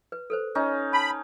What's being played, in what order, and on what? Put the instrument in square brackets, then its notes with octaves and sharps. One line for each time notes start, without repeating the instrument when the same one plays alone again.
[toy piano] B4
A4 B4 C5
[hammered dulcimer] C#4 D#4
[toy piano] A5 [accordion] B5